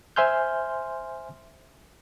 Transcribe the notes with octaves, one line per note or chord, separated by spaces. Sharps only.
C5 E5 G#5 C6 F6 G6